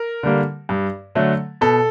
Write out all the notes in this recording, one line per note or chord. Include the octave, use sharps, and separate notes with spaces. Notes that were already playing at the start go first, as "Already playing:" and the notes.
Already playing: A#4
D3 G3 A#3
G2
D3 F#3 A3
B2 A4